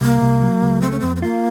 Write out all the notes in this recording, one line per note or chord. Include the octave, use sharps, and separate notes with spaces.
C2 A#3
C2
F#3
C#2
A3 C4
C#4
F2 C4
C4
A#3 F4